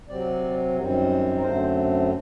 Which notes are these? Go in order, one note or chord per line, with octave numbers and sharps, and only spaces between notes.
C3 F#3 C4 D5
F#2 D#3 G3 C4
A#4
F#2 D3 A3 C4 C5